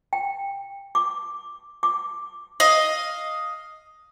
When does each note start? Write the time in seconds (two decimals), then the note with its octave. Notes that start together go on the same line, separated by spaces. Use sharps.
0.13 G5
0.95 D6
1.83 D6
2.60 D#5 F5